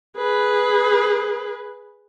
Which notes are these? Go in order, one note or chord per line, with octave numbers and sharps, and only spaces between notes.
G#4 B4